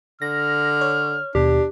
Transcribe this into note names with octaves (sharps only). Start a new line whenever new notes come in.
D3 F6 A#6
C#5
D#2 B2 D4 G4